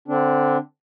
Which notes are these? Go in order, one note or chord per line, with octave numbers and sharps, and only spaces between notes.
D3 C4 D4